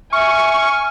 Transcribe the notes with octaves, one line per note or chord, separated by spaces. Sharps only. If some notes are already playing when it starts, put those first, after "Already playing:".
E5 G#5 C#6 F6